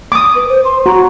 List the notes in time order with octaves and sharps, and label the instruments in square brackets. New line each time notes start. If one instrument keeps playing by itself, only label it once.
[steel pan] D6 D#6
[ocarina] B4
C5
C6
[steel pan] F#4 [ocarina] A#5